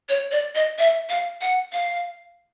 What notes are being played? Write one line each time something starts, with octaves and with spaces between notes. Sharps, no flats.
C#5
D5
D#5
E5
F5
F#5
F5